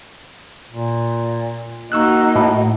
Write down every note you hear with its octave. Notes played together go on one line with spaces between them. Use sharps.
A#2
A#3 D#4 F#4 C#6 E6 F#6
A2